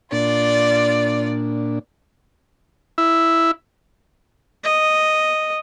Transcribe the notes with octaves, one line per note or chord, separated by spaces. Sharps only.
A#2 D4 F4 D5
E4
D#5